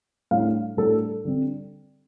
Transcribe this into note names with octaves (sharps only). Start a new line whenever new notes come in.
A2 G3 D4 F5
A2 G3 D4 A4
D3 G3 C4